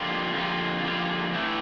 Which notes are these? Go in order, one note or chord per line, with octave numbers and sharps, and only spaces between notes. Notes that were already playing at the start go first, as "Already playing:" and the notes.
Already playing: F2 D3 G3 A#3 F4
F2 D3 G3 A#3 F4
F2 D3 G3 A#3 F4
A2 E3 A3 D4